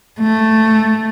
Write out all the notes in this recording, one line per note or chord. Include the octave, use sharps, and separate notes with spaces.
A3